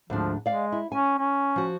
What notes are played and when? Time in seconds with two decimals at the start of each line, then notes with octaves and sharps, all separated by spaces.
0.10 D2 G#2 F3 D4
0.46 G#3 D5 F5
0.72 E4
0.92 C#4 G#5
1.18 C#4
1.56 F3 F#4